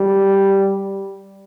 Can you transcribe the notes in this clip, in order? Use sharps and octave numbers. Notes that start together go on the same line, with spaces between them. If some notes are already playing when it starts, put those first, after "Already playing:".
Already playing: G3